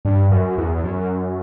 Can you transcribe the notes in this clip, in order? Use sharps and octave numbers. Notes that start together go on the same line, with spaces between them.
G2
F#2
E2
F#2